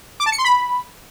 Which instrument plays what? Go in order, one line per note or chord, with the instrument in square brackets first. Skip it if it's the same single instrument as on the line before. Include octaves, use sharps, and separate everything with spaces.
[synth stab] D6
A5
C#7
C6
B5